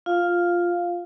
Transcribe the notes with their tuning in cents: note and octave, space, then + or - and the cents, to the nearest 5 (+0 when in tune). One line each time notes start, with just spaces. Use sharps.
F4 +0 F5 +0